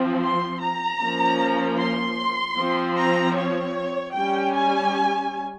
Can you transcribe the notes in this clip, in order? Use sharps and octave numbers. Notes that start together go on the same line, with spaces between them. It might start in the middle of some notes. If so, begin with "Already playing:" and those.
Already playing: F3 C4
C6
A#5
F3 A#3 C#4
C6
F3 C4
A#5
C#5
G3 C#4 G5
G#5